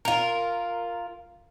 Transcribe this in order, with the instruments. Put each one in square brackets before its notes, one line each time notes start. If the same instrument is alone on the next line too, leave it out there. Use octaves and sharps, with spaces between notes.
[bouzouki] F4 A#4